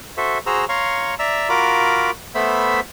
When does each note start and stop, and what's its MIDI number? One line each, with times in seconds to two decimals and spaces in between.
0.17 0.38 66
0.17 0.38 69
0.17 0.38 72
0.17 0.38 76
0.46 0.65 66
0.46 0.65 68
0.46 0.65 72
0.46 0.65 82
0.46 0.65 88
0.69 1.15 73
0.69 1.15 77
0.69 1.15 82
0.69 1.15 84
0.69 1.15 85
1.19 1.49 74
1.19 1.49 76
1.19 1.49 82
1.19 1.49 88
1.49 2.11 65
1.49 2.11 66
1.49 2.11 70
1.49 2.11 82
1.49 2.11 83
1.49 2.11 86
2.35 2.80 57
2.35 2.80 59
2.35 2.80 72
2.35 2.80 76
2.35 2.80 83
2.35 2.80 88